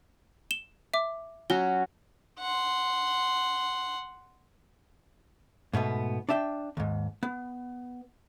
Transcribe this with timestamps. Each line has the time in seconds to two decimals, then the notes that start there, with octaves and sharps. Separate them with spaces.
0.51 E7 G7
0.94 E5 D6
1.50 F#3 C#4 F#4 G7
2.39 F#5 C6
5.73 G#2 B2 A3 B3
6.29 D4 D5 E5 G5
6.77 D#2 G#2
7.23 B3